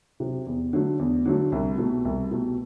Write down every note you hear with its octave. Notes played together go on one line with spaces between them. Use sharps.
C3 F#3
E2
D3 F#3 A3
E2
D3 F#3 A3
C2
B2 A3
C2
B2 A3